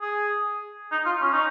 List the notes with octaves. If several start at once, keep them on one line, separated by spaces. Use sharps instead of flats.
G#4
D#4
F4
C#4
D#4